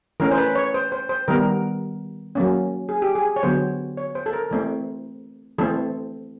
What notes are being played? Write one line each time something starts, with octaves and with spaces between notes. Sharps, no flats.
E3 A3 C#4 A#4
C5
B4
C#5
C5
C5
C5
D#3 G3 B3 A#4
F#3 A#3 C#4
G#4
G4
G#4
C#5
D3 F#3 B3 C5
C#5
C5
A4
A#4
E3 A3 C4
E3 A3 C4 A4